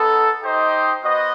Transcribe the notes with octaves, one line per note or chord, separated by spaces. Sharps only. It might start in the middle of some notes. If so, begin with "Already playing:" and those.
Already playing: B3 D#4 A4
D#4 G4 C5 D#5 G5
B3 F#4 C5 D#5